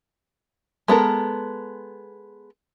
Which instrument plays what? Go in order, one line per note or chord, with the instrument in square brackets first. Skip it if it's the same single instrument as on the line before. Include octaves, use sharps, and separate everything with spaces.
[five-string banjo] G#3 B3 A4 A#4